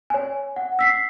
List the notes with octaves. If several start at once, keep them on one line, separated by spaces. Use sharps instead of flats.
C#5 G#5
F#5
E6 B6 C7